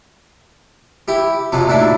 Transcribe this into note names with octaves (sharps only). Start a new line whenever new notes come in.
E4 G4
F2 C3 F3 F#3
D#2 A2 D4 E4 B5